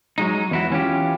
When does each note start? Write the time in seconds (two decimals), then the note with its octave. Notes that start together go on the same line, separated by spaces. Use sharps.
0.18 F#3 G#3 D#4
0.51 E2 E4 F#4
0.71 E3 C#4 F4 G4